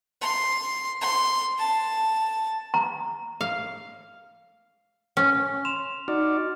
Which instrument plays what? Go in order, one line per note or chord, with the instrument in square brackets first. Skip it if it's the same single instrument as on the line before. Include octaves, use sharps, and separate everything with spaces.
[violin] C6
C6
A5
[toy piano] A#5
[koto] F5
C#4
[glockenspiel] C6 E7 F7
[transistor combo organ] D#4 F#4 D5 [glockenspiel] F6